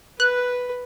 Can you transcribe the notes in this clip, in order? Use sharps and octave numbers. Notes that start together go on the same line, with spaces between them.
B4 F#6